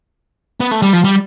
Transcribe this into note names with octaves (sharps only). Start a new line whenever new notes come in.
B3
A3
G3
F3
G3